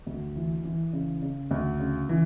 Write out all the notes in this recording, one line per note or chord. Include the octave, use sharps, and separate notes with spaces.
D2
E3
E3
C#3
C#3
D2
C#3
E3